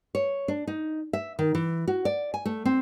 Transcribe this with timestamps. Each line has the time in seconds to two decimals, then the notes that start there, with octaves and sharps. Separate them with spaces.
0.15 C#5
0.48 D4
0.67 D#4
1.13 E5
1.39 D#3
1.55 E3
1.88 F#4
2.05 D5
2.34 G#5
2.45 A3
2.65 C4